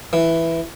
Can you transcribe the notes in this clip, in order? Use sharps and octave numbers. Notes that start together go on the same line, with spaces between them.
E3